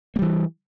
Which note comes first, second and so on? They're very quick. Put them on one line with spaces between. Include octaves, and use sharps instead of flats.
A#3 G3 E3